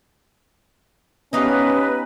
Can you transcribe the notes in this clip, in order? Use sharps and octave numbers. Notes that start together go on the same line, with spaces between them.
B3 C#4 D#4 G4 B4 D#5 F5